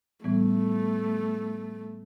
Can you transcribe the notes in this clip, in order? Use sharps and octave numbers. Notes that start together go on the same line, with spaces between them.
A2 E3 G3 A3 B3